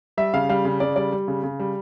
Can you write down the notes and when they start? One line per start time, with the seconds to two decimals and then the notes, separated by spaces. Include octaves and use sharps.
0.18 G3 E5
0.34 C#3 F5
0.49 G3 F5
0.65 C#3
0.80 C#3 D5
0.96 G3 D5
1.12 G3
1.28 C#3
1.43 C#3
1.60 G3